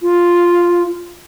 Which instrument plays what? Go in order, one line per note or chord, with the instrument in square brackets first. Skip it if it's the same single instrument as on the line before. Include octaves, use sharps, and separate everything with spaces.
[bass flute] F4